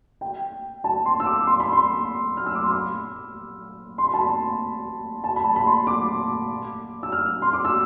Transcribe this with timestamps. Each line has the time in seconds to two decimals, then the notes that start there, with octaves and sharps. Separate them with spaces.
0.21 G5
0.84 A5
1.06 C6
1.20 E6
1.26 D6
1.47 C6
1.60 B5
1.73 C6
2.37 F6
2.46 E6
2.55 D6
2.63 C6
2.72 B5
3.98 C6
4.06 B5
4.14 A5
4.21 B5
5.24 A5
5.36 B5
5.44 A5
5.56 B5
5.66 C6
5.87 D6
7.03 E6
7.12 F6
7.42 C6
7.53 D6
7.65 E6